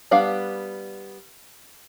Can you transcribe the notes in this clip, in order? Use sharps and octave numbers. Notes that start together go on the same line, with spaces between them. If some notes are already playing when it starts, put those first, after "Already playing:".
G3 B3 D4 F5